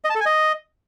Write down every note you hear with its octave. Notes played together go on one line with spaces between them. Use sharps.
D#5
A5
A4
G#5
D#5